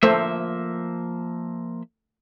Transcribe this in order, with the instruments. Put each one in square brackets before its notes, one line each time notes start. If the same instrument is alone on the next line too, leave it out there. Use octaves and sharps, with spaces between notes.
[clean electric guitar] F3 A#3 E5 [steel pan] A3 C5